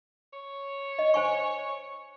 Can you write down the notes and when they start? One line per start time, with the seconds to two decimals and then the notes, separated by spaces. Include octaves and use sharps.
0.33 C#5
0.99 D#5
1.14 C5 G#5 C#6